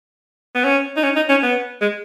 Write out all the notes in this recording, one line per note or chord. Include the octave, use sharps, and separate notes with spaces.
B3
C#4
D#4
C#4
D#4
C#4
B3
G#3